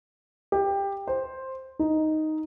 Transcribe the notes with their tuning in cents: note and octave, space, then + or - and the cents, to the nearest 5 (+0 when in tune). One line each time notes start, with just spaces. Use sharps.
G4 +15
C5 +5
D#4 +0